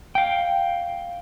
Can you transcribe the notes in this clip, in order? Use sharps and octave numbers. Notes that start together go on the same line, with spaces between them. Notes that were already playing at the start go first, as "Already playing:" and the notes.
F5 G5